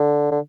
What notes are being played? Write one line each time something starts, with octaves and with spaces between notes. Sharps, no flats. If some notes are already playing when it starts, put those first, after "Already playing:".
Already playing: D3
D3